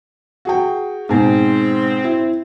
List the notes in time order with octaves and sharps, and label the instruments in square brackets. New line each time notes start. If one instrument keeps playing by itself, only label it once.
[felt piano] F#4 G#4 G5
[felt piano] G#2 B2 G#5 [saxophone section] C4
[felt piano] E4